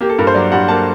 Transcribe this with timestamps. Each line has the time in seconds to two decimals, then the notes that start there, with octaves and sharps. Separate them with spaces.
0.01 A#3 G4
0.09 A4
0.18 G2 A#4
0.27 C5
0.34 F#3 D5
0.52 G2 F#5
0.68 A#3 A5